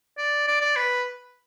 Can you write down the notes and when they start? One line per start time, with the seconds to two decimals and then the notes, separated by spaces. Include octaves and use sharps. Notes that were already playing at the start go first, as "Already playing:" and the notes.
0.18 D5
0.48 D5
0.61 D5
0.76 B4